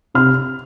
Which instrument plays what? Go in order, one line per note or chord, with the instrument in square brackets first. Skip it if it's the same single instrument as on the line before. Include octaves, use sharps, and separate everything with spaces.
[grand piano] C3 F6